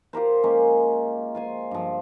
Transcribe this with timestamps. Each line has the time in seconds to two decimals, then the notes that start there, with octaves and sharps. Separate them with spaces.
0.13 F4 G4 A#4 C5
0.44 G#3 A#3 C#4
1.35 F4 C5 G#5
1.71 G2 F3